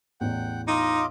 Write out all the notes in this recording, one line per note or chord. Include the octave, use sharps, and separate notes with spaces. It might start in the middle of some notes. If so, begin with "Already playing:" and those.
A1 E2 F#5 G5
D#4 F4 D#5 D6